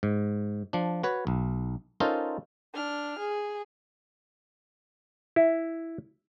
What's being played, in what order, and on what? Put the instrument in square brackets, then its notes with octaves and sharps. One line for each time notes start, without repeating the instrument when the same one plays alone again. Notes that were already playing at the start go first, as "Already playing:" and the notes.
[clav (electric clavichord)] G#2
F3 D4
F#4 B4 C#5
B1
C#4 D#4 F4 A4 A#4 C5
[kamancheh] D4 F6
G#4
[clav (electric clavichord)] E4